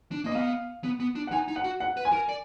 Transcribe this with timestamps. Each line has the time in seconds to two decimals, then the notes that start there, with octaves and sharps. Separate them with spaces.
0.11 D4
0.24 A#3 D#5
0.35 B3 F5
0.84 B3
1.00 B3
1.15 D4
1.27 F#5
1.32 D#4 G#5
1.48 D#4
1.56 F#5
1.64 F#4
1.80 F#5
1.97 B4
2.05 G#5
2.13 A#4
2.29 D5